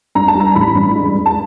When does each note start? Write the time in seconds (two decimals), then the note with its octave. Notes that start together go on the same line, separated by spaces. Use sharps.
0.15 G2 A#5
0.28 A5
0.35 G3 A#5
0.55 A1 B5
0.75 G2
0.95 G#3
1.15 G#3
1.26 A5